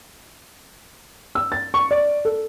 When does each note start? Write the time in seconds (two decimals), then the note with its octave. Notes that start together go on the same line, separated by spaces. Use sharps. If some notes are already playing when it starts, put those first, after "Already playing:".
1.35 E6
1.52 A6
1.74 C#6
1.91 D5
2.25 A4